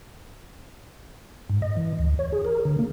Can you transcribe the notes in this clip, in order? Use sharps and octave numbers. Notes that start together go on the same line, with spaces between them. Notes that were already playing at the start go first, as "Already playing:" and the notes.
G#2
D#5
E3
D2
C#5
G#4
A#4
D3
A#3